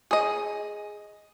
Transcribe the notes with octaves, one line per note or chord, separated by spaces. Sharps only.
G#4 D#5